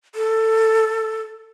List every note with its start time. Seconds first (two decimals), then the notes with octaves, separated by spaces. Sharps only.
0.15 A4